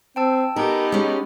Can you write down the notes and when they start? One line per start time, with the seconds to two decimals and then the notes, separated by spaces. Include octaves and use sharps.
0.16 C4 G5 A5 E6
0.56 B3 D#4 G4 A#4
0.92 G#3 C#4